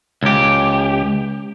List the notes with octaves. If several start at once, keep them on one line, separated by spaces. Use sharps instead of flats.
C#2 G4